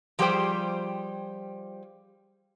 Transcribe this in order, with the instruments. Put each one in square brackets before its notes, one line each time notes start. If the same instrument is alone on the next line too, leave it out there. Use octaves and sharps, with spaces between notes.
[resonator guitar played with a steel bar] F3 G3 G4 G#4 C5 G5